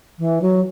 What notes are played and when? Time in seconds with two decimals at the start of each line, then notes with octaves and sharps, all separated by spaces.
0.18 E3
0.41 F#3